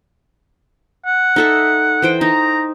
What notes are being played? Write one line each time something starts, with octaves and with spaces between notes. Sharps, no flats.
F#5
D#4 A4 E5
E3 C5 G5
D#4 A#5